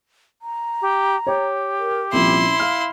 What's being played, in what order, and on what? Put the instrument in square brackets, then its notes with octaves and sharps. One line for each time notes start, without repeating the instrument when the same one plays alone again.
[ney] A#5
[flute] G4
[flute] G4 [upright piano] C#5
[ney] A#4
[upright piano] C2 A#2 F3 [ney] C#4 [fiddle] E4 C6
[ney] F5 [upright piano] F6